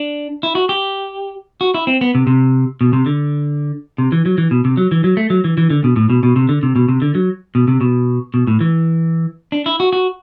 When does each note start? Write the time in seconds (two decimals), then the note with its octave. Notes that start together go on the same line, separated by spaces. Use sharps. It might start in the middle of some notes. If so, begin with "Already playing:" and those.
Already playing: D4
0.43 E4
0.55 F#4
0.69 G4
1.61 F#4
1.74 E4
1.87 C4
2.01 B3
2.15 C3
2.27 C3
2.81 B2
2.93 C3
3.06 D3
3.98 C3
4.12 E3
4.26 F#3
4.38 E3
4.51 B2
4.65 C3
4.77 F#3
4.92 E3
5.04 F#3
5.17 A3
5.30 F#3
5.44 E3
5.58 E3
5.70 D3
5.84 B2
5.96 A2
6.10 B2
6.23 B2
6.36 C3
6.49 D3
6.63 C3
6.76 B2
6.89 C3
7.02 D3
7.15 F#3
7.55 B2
7.68 C3
7.81 B2
8.34 B2
8.47 A2
8.61 E3
9.52 D4
9.66 E4
9.80 F#4
9.93 F#4